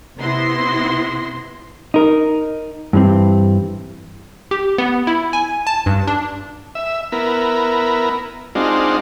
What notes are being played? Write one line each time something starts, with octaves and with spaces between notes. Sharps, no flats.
C3 B3 E4 C6 A#6
D#4 A#4
G2 E3 C4
G4
B3
E4
G#5
A5
G2
D4
E5
B3 E4 A#4
G#3 C4 D4 D#4 F4 F#4